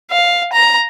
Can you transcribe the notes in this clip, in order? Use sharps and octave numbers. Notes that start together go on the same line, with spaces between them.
F5
A#5